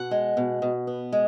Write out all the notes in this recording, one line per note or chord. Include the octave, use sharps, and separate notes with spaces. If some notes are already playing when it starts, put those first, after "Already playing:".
Already playing: B2 F#5
G#3
B2
B2
B3
G#3